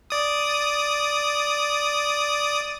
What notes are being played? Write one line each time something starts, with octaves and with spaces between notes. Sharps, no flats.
D5 D#6